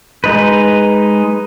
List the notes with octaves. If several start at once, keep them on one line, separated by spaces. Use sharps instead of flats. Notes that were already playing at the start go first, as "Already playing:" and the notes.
G#3 D#4 B4